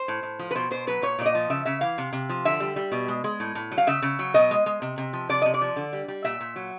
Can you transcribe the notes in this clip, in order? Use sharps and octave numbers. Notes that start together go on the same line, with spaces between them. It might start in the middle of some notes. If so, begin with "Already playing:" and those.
Already playing: C5
A2
A2
F3
B4
B2 C5
B2 C5
F#3 B4
A#2 C#5
A#2 D5
D#5
F3
C#3 E5
C#3 E5
E3 F5
C3
C3
F3
D3 E5
G3
G3
B2
G#3
G#3
A2
A2
F#3
F5
C#3 E5
C#3
F#3
B2 D#5
G#3
G#3
C3
C3
F3
C3 D5
C3 D#5
D5
F3
D3
G3
G3
A#2 E5
A#2
F#3